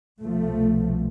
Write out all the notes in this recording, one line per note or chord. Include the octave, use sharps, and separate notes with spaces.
C2 B2 F3 A3